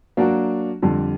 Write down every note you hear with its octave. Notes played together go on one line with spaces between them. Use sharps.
F#3 A#3 D4 F#4
F2 D3 G3